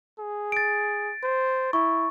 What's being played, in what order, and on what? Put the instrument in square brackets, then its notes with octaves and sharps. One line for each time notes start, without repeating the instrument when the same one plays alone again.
[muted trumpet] G#4
[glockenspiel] A6 D7
[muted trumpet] C5
[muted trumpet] E4 [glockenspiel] C#6